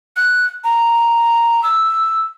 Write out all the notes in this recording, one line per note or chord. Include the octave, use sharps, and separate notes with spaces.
F#6
A#5
E6